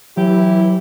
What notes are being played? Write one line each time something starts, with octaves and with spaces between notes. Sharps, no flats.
E3 F#3 E4 G4